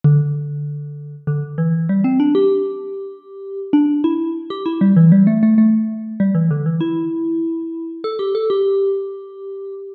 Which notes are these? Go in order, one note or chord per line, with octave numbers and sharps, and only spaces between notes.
D3
D3
E3
G3
C4
D4
G4
D4
E4
G4
E4
G3
E3
G3
A3
A3
A3
G3
E3
D3
E3
E4
A4
G4
A4
G4